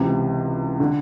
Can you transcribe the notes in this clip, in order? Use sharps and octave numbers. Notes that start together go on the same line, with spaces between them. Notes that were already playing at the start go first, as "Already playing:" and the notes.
Already playing: C#2 C3 E3
D3